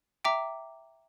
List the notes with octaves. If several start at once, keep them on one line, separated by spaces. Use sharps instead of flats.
E5 G5 A#5 D6